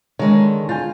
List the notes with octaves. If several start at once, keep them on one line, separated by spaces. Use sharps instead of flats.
D3 D#3 G#3 C#5
F4 G#5 G6 A6